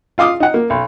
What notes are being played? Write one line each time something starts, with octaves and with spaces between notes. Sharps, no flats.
F4 F5 D6 D#6
D#4 F#5
A#3
B1